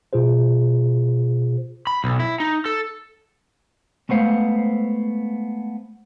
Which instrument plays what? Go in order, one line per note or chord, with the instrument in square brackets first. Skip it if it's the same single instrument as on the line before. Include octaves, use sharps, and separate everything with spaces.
[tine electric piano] B2 F4 G#4 C5
[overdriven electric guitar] B5
B1
E4
D#4
A4
[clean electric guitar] G#3 A3 B3 C5 F5